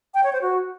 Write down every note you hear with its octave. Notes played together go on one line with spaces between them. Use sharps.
G5
C#5
C5
F#4